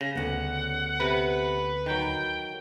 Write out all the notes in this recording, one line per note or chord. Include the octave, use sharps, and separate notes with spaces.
C#3 A#6
D2 B3 F#5
C3 B4
D#3 F#3 G5